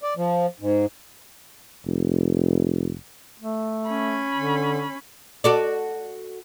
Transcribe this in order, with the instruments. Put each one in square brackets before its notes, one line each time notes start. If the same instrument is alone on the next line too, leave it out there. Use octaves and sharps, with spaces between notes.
[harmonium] D5
F3
G#2
[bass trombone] F1
[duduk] A3
[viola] C#4 B5
[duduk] D3
[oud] F#4 A4 D5